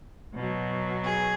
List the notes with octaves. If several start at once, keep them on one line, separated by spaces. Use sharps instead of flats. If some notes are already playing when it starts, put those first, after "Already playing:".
B2 F#3
G#4